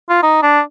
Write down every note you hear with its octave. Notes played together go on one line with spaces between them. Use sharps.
F4
D#4
D4